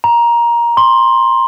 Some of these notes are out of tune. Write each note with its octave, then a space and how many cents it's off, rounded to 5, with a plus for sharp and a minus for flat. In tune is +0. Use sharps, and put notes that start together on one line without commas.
A#5 +15
C6 +15